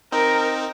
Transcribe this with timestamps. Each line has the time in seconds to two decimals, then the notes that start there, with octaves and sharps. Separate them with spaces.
0.12 C4 D#4 A#4